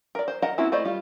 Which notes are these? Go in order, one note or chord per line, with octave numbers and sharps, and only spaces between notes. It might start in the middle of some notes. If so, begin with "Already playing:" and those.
A#4 D5
C5
A#4 D#5 F#5 A5 A#5
A#3 C4 C#4 E4 F#4
A3 E4 C5 D5 D#5
G3 F4